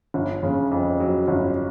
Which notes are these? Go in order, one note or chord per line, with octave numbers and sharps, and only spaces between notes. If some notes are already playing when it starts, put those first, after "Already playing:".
G1
C#3
F2
F#3
G1